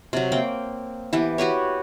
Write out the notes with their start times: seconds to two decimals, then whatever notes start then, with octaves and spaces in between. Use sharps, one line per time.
0.13 C3 F#3
0.32 A#3 C4 G5
1.13 E3 B3 G4
1.38 F#4 G4 B4 C#5